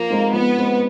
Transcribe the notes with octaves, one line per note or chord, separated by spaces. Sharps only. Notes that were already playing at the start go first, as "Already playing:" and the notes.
Already playing: F3 A#3
G#3 C4 D#4
F3 B3
G#3 C4 D#4